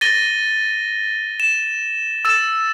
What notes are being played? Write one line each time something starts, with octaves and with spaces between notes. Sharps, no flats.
A6 A#6 D#7 G7
E7
E6 A6 E7